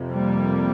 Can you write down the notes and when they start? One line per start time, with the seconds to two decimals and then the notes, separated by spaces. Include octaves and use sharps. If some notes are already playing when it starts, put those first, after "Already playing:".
Already playing: F2 C3
0.10 G3 A#3